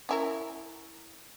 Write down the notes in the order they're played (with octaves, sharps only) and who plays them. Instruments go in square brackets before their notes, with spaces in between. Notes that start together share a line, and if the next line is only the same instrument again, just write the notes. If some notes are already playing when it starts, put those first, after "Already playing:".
[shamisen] C#4 E4 A#4